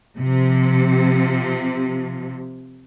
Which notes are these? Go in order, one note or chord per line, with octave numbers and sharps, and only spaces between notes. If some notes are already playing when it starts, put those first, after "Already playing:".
C3 F3